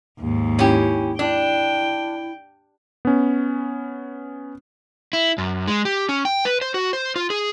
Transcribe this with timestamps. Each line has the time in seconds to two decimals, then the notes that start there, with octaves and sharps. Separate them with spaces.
0.19 D#2 G#2
0.59 C#4 E4 G4
1.19 D4 E4 G5
3.05 B3 C#4
5.13 E4
5.38 F#2
5.68 G#3
5.85 G4
6.09 C#4
6.25 G5
6.45 B4
6.61 C5
6.74 F#4
6.93 C5
7.16 F4
7.30 G#4